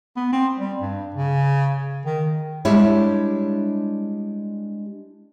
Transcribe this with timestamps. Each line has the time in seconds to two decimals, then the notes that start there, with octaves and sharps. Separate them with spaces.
0.16 B3
0.33 C4
0.58 G3
0.82 G2
1.15 C#3
2.05 D#3
2.65 G3 G#3 D4 E4 G4 C#5